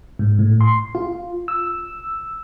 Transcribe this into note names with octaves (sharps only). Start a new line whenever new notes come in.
G#2
A2
C6
F4
E6